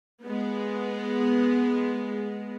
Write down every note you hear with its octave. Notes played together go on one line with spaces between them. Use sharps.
G#3 B3